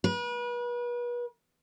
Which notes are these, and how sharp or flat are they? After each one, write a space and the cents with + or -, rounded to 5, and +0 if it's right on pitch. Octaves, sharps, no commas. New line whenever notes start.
B4 -35